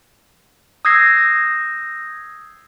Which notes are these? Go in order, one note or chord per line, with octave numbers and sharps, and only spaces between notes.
D#6 E6 G6 G#6 A#6 C7